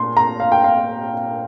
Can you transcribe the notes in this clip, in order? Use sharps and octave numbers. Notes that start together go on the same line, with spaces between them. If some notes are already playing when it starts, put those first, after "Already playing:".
Already playing: A#2 C6
A#5
F5
G5
F5